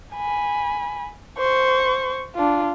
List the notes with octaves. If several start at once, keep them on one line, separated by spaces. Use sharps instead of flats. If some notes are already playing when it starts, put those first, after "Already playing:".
G#5 B5
C5 C#6
D4 F4